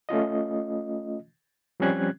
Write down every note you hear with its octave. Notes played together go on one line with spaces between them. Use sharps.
A3 C#4 F4 D#5
F3 G3 C4 C#4 F#6 G#6